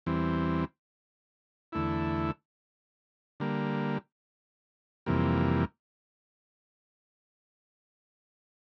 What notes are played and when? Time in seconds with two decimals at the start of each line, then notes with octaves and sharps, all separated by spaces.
0.06 E2 E3 G3 C4
1.72 E2 D3 A3 E4
3.40 D3 G3 A#3
5.06 F2 C3 E3 G3 A#3